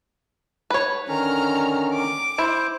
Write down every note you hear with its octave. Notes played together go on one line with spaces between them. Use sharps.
B4 C#5
D3 D#3 C#4 A#5 F6
D6
E4 C5